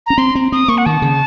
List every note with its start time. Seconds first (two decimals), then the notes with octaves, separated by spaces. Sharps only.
0.06 C#4 A#5
0.18 C4 C6
0.35 C4
0.52 C4 D#6
0.68 A#3 C#6
0.78 F#5
0.86 D#3 A5
1.02 C#3